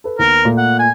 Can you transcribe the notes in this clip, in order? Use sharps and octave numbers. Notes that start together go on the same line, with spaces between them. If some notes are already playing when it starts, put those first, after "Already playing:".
A4 B4
D#2 B3 A#4
A#2 A3 A#3
F#5
G#5